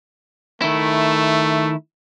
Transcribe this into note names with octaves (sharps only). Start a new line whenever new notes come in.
D#3 A3 E4